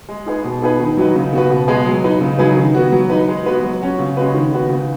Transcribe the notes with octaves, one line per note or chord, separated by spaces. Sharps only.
G#3
D#4 G#4 B4
B2
B3 D#4 G#4 B4
D#3
F#3 D#4 F#4 B4
C#3
B3 F#4 B4
B2
G#3 B3 G#4 B4
F#3
D#4 B4
C#3
F#3 D#4 G#4 B4
D#3
B3 F#4
F#3
D#4 B4
G#3
B3 F#4 B4
F#3
C#4 F#4
C#3
G#3 C#4 F#4 B4
D#3
B3 F#4 B4
C#3